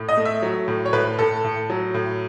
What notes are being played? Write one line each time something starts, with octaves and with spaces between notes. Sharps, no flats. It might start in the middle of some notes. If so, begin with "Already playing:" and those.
Already playing: A2
D#5
A3
E5
F#3
A2
C#5
A2 B4
A2 A4
A2
F#3
A2